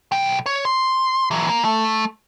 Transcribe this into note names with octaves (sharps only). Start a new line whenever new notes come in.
B1 G5
C#5
C6
E3 F#3
A#3
A3